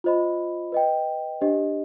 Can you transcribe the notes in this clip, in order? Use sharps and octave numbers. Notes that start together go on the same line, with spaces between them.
F4 C5 D#5 B5
B4 D#5 G5
D4 G4 C5 D#5